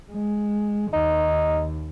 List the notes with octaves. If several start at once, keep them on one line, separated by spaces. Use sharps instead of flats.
G#3
D#2 D#4